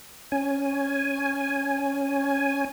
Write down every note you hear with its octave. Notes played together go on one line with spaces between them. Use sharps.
C#4 G#5